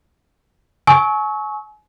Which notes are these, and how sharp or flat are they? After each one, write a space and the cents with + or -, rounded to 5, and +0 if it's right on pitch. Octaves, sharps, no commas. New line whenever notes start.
G#5 +35 C#6 +0 E6 -35